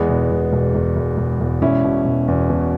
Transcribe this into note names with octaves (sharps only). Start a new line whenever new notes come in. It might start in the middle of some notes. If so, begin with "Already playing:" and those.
Already playing: E2 G#3 B3
E1
E1
E1
E1
E1
E1
E1
E1 C#4 E4
B2
E1
E2
B2